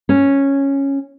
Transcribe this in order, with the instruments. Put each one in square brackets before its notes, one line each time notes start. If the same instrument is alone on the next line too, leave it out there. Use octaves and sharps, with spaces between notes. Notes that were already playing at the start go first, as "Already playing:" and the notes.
[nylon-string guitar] C#4